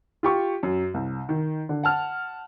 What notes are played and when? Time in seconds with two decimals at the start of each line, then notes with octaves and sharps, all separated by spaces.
0.23 F4 G4 C#6
0.63 F#2
0.94 C2
1.29 D#3
1.69 D3
1.83 F#5 A5 F6